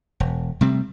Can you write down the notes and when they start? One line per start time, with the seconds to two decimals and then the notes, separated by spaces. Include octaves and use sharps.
0.20 E1
0.61 C3 G3 A3 C4